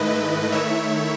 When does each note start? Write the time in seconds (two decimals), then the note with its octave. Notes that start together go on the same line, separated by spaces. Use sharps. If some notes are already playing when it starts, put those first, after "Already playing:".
Already playing: G#2 D#3 A3 E4 B4 D#5
0.52 D#3 A3 E4 C#5 E5